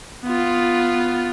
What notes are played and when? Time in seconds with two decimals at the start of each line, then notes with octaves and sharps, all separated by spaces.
0.24 B3 F4